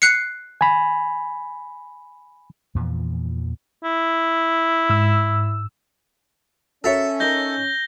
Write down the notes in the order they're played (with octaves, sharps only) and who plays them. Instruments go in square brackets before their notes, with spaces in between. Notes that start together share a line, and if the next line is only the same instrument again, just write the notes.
[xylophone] F#6 C7 C#7
[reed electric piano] G#5 B5
[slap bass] E2 A#2 E3 F3
[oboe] E4
[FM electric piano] G#2 E6
[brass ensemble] C#4 [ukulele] F#4 A#4 C#5 [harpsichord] A4 E5
[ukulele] D#4 A#4 [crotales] G6 A#6 G7